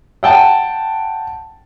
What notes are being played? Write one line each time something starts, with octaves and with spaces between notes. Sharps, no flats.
F#5 G5 A5